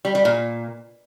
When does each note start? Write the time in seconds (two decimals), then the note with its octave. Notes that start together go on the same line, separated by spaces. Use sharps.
0.05 G3
0.15 G3
0.25 A#2